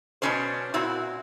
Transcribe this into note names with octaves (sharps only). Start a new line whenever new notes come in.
B2 D#3 F#3 C#4 D4 C5
A#2 C4 E4 F#4